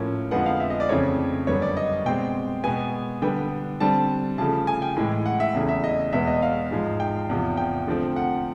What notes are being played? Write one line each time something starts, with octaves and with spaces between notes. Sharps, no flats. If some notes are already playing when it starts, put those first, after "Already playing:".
Already playing: A2 F3 A#3 C#4
F2 D3 F3 G#3 B3 F#5
F5
E5
D#5
D5
F2 C#3 E3 A3 C4 C#5
F#2 D3 G3 B3 C#5
D5
D#5
B2 G#3 C4 G5
B2 G#3 B3 G#5
D3 G3 B3 G5
D3 G3 C4 A5
C#3 F3 A3 A5
G#5
G5
A2 E3 G#3
F#5
E5
E2 C#3 E3 A3
E5
D#5
E2 B2 G#3 B3 E5
D#5
F5
G#2 F3 G#3
G5
E2 C3 F3
G5
D3 F3 A3 C4
F#5